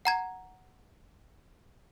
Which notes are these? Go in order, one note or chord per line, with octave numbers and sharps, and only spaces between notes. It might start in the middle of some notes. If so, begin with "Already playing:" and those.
F#5 A#5 G#6